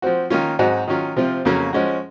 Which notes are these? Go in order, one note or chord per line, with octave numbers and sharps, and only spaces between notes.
F3 C4 F#4
D#3 A#3 C#4 F4
G#2 F#3 C4 D#4 F#4
D#3 F#3 C#4 F4
C3 F3 C4 F4
F2 C#3 F#3 A#3 C#4
F3 G#3 C#4 F#4